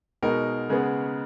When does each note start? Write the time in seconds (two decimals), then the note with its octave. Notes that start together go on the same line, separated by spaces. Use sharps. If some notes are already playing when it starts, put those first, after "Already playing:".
0.23 B2 G#3 D#4 A#4
0.69 C#3 G#3 B3